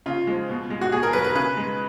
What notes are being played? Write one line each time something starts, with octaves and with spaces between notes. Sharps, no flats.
C#3 F4
F3 G#3
B2
G#3
F#4
B2 G#4
A#4
F#3 B4
B4
C#3 B4
G#3